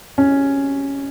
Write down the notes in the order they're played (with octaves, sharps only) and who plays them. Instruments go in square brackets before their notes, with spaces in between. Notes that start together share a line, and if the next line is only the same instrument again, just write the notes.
[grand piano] C#4